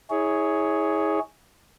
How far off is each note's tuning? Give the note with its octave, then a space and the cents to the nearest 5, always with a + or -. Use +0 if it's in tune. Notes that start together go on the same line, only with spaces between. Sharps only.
E4 -35 G#4 +0 C#5 +5